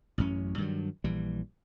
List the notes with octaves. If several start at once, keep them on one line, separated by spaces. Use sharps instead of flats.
A1 F#2 C#4
G2 D#3 F#3
A#1 E3 G3